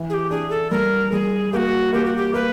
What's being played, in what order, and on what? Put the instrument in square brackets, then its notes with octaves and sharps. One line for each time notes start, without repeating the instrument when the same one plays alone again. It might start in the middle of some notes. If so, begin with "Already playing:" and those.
Already playing: [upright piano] E3
[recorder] G#4
G4
[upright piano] D4 [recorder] G#4
[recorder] A4
[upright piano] G3 [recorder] A#4
[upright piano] G3 [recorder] G#4
[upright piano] A#3 [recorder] F#4 G4
[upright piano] A#3 [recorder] G4
[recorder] F#4
G4
[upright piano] A#3 [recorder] B4